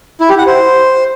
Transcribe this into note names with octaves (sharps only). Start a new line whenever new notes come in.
E4
G4
F#5
C5